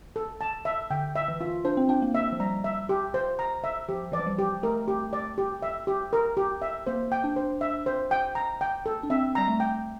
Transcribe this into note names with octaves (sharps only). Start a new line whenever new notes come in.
A4
A5
E5
D3 G5
E5
E3
F4
D4 C5
C4
D4 G5
A#3
E5
F3
G3 A#5
E5
G4
C5
A#5
E5
F3 G4
E3 D5
F3
G3
G4
A3 A#4
G4
D5
G4
E5
G4
A#4
G4
E5
A#3 C5
G5
D4
C5
E5
C5
G5
A#5
G5
A4
D4
C4 E5
G3 A#5
A3
G5